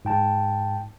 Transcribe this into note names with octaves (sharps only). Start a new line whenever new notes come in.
G#2 G5 A5